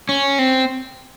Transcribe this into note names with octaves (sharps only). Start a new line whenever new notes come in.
C#4
C4